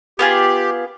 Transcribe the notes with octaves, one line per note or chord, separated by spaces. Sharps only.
B3 F4 G4 G#4